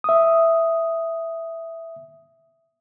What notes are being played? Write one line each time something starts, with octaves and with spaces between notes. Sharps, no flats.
E5 D#6